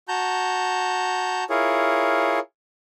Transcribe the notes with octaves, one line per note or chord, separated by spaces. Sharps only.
F#4 A5 A#5 G6
E4 F4 G#4 A#4 C#5